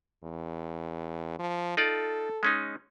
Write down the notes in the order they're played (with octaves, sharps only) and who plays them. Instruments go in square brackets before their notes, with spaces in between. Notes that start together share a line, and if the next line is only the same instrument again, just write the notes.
[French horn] E2
F3
[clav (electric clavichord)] D#4 F4 D5 [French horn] A4
[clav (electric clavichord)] G#3 C#4 D#4